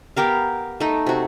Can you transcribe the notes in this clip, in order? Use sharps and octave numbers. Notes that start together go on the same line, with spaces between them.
B3 G4 A#4 F5
A3 D#4
C3 F#4